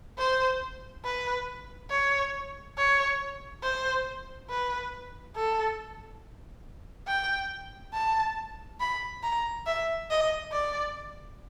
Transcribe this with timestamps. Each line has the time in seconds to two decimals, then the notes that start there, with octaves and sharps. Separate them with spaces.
0.18 C5
1.05 B4
1.90 C#5
2.78 C#5
3.63 C5
4.50 B4
5.36 A4
7.08 G5
7.94 A5
8.80 B5
9.23 A#5
9.66 E5
10.10 D#5
10.52 D5